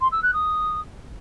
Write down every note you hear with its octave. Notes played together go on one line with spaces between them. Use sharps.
C6
E6
F#6
D#6